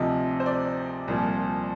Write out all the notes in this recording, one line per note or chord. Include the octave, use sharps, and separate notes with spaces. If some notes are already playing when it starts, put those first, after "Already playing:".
Already playing: D2 C3 F3 D#5
C5
D5
C2 A#2 F3